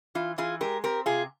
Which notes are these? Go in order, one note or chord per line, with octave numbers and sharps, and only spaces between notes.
E3 F4
E3 F4 G#4
G#3 G4 A#4
C4 G4 A#4
C3 F4 G#4